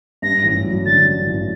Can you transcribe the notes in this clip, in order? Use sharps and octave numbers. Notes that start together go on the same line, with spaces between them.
G2 A#6
A1
F#3
D3 A6
G2
A1